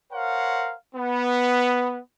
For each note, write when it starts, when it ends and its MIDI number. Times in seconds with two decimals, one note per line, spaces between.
0.11 0.73 70
0.11 0.73 72
0.11 0.73 73
0.11 0.73 77
0.11 0.73 78
0.95 1.99 59